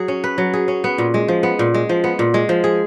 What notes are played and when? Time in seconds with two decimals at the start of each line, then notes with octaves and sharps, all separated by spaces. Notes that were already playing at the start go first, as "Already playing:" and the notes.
Already playing: F#3 G#4
0.08 C#4
0.24 B4
0.38 F#3
0.53 G#4
0.68 C#4
0.84 B3
0.98 A#2
1.14 G#3
1.28 F3
1.43 B3
1.59 A#2
1.74 G#3
1.89 F3
2.04 B3
2.19 A#2
2.34 G#3
2.49 F3
2.64 G#4